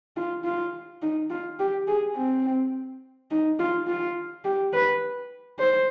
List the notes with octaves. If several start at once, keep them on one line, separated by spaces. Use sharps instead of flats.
F4
F4
D#4
F4
G4
G#4
C4
D#4
F4
F4
G4
B4
C5